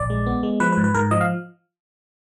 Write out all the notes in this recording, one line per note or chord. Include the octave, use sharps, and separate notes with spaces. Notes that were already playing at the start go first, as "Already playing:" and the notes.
Already playing: A#1 D5
G#3
B3
G#3
F3 B4
B4
G#2
B4
G#2 A#4
F3 D#5
F5